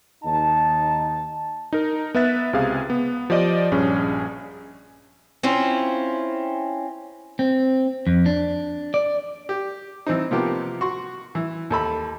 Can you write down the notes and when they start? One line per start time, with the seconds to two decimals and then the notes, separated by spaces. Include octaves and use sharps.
0.24 D#2 D#4 A5
1.73 D#4 A#4
2.14 B3 B4 E5 F#6 A6
2.53 C#2 C3 G#4 F5
2.90 B3
3.30 F3 G4 D5 D#5
3.71 A#1 G2 C#4 G#4
5.43 C4 C#4 E4 F4
7.39 C4
8.07 F2
8.26 D4
8.94 D5
9.49 G4
10.06 E3 C4 D#4
10.31 C3 F3 A#3 B3 G4
10.81 F#4 C6 C#6
11.35 E3
11.70 D#2 A4 B5